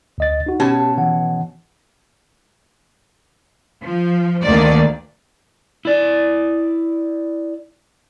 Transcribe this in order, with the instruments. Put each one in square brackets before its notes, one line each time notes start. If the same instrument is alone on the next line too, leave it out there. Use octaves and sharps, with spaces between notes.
[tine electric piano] D2 D#5 A6
D#4 F#4
[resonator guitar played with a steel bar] B2 C#4 A5 [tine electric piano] G4
[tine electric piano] E3 F#5
[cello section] F3
D2 D#3 A#3 D5
[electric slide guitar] E4 D5